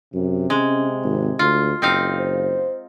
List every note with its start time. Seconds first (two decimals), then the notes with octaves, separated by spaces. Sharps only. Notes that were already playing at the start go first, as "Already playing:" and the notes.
0.14 F#2 C3
0.50 G#3 C#4
1.04 G#1
1.39 D2 F4
1.82 F#1 C4 D#4 F5
2.18 C5